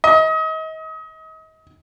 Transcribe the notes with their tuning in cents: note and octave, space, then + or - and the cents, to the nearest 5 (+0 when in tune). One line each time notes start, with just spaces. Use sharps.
D#5 +35